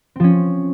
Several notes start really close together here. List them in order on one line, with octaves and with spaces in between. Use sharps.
C4 F3 C#4